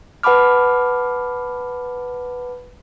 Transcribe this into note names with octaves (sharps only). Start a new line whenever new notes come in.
B4 F#5 A5 B5 D6 F6